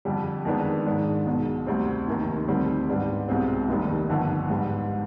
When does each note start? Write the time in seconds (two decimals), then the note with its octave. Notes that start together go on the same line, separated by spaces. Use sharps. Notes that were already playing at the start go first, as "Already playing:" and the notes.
0.05 F2 D3 G3
0.45 F2 D#3 G#3 B3 D4
0.86 G#2 D#3 G#3 D4
1.26 B1 B2 G#3
1.67 D2 C3 G3 C4
2.07 F1 D#2 D#3
2.48 D2 D3 G3 C4
2.89 G#2 G3 B3 D4
3.28 C2 B2 G#3 C4
3.69 F1 D#2 D#3 G3
4.09 G1 F2 D3
4.50 G#2 G3 B3